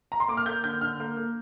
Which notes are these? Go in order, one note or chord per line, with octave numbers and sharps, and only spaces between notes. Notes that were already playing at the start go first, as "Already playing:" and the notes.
A#5
C6
A#3 D6
F6
A#3 G6
D3 G6
D3 F6
A#3
A#3